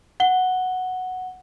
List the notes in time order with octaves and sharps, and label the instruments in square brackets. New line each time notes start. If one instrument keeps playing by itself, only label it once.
[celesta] F#5 G7